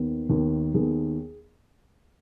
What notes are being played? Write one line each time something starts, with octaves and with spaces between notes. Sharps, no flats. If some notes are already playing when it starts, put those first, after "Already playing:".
Already playing: D#2 D#3 B3
D#2 D#3 B3
D#2 D#3 B3 G#4